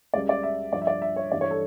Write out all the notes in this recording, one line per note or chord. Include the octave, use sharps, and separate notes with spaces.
C#2 C#3 G3 D5
D5
E5
G2 F3 D5
E5
D5
E5
C#5
G2 E3 G3 D5
C#5
A4